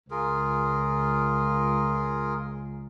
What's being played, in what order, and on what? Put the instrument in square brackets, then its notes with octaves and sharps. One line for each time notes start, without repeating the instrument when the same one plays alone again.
[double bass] C#2 [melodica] F4 G#4 A#4